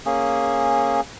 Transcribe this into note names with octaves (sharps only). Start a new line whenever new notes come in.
A#3 C#4 G#4